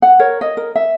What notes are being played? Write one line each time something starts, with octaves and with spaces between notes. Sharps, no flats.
F#5
A#4 C#5
D#5
A#4
E5